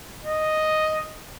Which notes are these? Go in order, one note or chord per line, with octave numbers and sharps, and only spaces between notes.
D#5